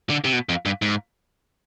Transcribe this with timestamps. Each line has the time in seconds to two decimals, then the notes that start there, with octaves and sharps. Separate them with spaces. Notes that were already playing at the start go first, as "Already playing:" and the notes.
0.10 D3
0.25 C3
0.33 B2
0.49 F2
0.66 G2
0.82 G#2